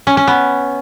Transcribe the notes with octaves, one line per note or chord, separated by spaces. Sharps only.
C#4
C#4
B3